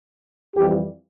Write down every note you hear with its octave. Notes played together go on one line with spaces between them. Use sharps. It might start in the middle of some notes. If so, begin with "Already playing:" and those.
F2 E3 G3 G4